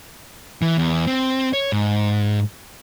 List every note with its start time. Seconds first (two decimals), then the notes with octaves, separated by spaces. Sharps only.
0.62 E3
0.78 E2
1.07 C4
1.53 C#5
1.72 G#2